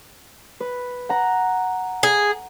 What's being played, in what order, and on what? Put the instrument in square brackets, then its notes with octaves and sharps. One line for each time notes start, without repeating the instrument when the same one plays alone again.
[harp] B4
F#5 A#5
[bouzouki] G#4